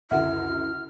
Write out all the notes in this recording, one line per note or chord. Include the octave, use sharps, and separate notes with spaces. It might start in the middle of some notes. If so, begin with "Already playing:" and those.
C#2 F#2 D3 E4 E5 F#5 F6